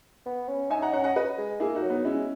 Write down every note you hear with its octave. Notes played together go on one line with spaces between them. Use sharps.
B3
C#4
D#4 E5 G#5
F#5 A#5
C#4 F#5 A#5
D#5 F#5
B4 D#5
G#3
A#3 E4 G#4
D#4 F#4
F#3
B3 D#4
G#3 C#4 E4